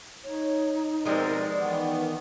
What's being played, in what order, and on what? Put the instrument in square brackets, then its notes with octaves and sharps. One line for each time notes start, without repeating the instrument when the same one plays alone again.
[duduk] D#4 [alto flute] C#5
[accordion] B2 C4 A#4 [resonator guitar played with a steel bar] F3 G#3 G4 [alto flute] D5
[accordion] D#3 B3 [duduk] E3